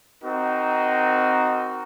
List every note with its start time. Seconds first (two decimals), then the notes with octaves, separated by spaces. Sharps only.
0.21 C4 D#4 F#4 A#4